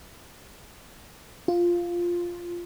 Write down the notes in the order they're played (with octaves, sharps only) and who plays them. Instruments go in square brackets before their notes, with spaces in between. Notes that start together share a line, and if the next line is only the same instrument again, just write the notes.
[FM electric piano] F4